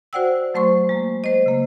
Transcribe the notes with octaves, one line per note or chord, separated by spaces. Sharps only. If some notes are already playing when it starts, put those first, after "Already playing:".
F#4 C5 D5 F#5 G5 E6
F#3 A3 C5 C6 C#6
G#3 A#3
C5 D#5
C#3 A#3